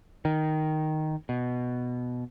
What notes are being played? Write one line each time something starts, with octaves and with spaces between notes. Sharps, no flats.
D#3
B2